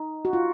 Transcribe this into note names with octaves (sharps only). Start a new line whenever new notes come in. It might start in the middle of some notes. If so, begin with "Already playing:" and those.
Already playing: D#4
F#4
F4